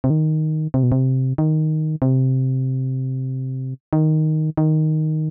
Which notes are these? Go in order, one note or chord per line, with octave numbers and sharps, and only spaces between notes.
C3
D#3
C3
B2
C3
D#3
C3
D#3
D#3